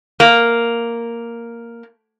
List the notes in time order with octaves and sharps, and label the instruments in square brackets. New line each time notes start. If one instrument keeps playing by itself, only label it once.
[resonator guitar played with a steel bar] A#3